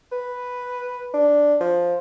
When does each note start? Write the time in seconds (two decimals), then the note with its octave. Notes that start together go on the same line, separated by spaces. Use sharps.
0.12 B4
1.14 D4
1.60 F3